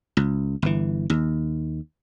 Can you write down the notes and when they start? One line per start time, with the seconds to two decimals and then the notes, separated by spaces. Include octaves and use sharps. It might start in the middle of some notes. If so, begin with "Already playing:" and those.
0.17 C#2
0.62 G1 E3
1.10 D#2